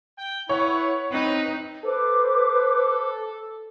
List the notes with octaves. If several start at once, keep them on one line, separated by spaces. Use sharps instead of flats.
G5
E4 B4 C#5 F#5
C4 D#4 B4
A4 B4 C5 D6